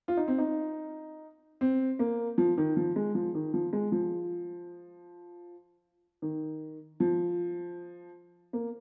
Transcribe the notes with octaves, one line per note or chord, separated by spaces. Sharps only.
F4
D#4
C4
D#4
C4
A#3
F3
D#3
F3
G#3
F3
D#3
F3
G#3
F3
D#3
F3
A#3